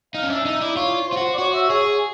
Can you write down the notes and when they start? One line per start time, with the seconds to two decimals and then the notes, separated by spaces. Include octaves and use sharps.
0.15 D#4 F5
0.23 C#4
0.30 D4 E5
0.45 D#4 E5
0.61 E4 D5
0.76 F4 C#5
1.08 F4 C5
1.17 F#4
1.34 D5
1.38 F#4 C#5
1.54 E5
1.69 G#4 C#5